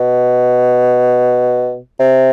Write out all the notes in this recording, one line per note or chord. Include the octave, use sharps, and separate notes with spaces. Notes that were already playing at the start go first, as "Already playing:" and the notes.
Already playing: B2
C3